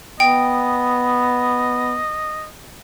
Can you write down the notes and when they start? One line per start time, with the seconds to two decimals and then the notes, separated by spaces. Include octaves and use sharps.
0.20 B3 D#5 G5